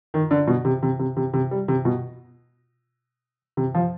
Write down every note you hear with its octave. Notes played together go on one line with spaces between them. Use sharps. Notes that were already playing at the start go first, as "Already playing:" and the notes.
D#3
D3
B2
C3
C3
C3
C3
C3
G3
C3
B2
C3
F3